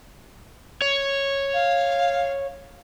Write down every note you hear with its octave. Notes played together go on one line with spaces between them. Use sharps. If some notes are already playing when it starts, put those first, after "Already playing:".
C#5
F5